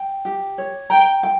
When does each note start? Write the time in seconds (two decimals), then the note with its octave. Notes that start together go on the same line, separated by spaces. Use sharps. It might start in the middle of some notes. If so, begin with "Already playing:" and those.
Already playing: G5
0.25 G4
0.58 C#5
0.90 G5 A#5
1.23 G5